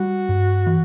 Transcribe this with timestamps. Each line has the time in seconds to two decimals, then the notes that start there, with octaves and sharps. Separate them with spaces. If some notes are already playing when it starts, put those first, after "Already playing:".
Already playing: G3 F#4
0.29 G2
0.67 E3